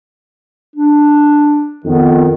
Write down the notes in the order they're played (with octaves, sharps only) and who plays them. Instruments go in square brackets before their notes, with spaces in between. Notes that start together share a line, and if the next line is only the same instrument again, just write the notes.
[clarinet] D4
[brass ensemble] F2 D#3 [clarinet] B3